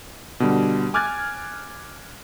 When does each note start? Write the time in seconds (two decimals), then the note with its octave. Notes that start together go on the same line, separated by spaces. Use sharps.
0.40 B2 D3 G3
0.94 G#5 D6 F6 F#6 G#6 A6